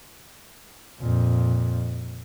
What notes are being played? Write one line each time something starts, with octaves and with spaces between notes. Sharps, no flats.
F2 A#2